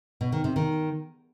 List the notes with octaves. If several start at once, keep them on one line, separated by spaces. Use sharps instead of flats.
B2
D#3
C3
D#3